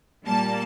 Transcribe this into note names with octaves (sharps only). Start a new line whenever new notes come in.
A#2 G3 A#3 A5